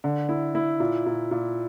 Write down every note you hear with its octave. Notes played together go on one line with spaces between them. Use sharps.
D3
E4
E4
A#2
A#2
A#2